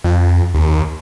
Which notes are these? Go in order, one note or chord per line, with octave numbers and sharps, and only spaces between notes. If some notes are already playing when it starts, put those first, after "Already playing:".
F2
D#2